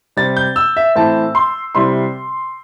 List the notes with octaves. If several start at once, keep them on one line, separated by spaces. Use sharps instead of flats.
C3 G3 C4 A6
G6
E6
E5
A2 E3 C4 E4 A5
C6
C3 G3 E4 C6